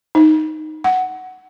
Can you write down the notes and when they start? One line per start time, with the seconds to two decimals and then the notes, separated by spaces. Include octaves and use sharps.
0.15 D#4
0.84 F#5